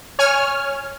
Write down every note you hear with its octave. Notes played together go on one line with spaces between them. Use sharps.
C#5 G#5 F6